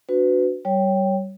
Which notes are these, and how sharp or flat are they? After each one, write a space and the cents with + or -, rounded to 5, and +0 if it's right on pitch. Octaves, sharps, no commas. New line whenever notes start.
D4 +0 F#4 +0 B4 +25
G3 -25 C#5 +0 G5 +0